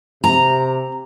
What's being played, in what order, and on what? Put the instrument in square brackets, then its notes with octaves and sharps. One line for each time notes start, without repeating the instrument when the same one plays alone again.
[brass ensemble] C3 [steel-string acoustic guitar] A#5